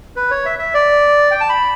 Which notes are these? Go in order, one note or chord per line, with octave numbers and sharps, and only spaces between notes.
B4
C#5
E5
E5
D5
G5
A5
B5